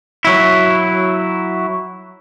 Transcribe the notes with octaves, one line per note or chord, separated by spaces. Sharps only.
F#3 E4